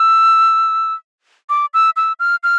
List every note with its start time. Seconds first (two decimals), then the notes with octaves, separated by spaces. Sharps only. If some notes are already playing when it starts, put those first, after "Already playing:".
Already playing: E6
1.49 D6
1.74 E6
1.96 E6
2.20 F6
2.43 F6